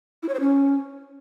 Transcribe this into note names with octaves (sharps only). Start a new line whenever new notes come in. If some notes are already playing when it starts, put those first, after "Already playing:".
E4
C#5
C5
C#4